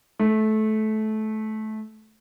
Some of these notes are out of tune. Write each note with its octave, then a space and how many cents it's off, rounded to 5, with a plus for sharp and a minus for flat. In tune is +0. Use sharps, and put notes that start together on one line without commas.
A3 -20